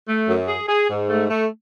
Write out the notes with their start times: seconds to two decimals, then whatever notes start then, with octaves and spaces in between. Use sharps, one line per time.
0.07 A3
0.28 F#2
0.47 G#4
0.68 G#4
0.89 G#2
1.09 A3
1.30 A3